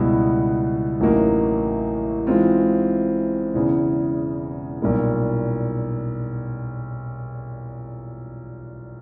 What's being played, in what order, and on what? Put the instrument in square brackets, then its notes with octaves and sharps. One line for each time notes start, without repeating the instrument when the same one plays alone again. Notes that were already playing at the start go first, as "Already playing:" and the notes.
Already playing: [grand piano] C#2 B2 G3 B3 E4
A1 A2 F#3 A#3 D#4
G#2 E3 G#3 C4 F4
E1 E2 C#3
B1 A#2 G3 A#3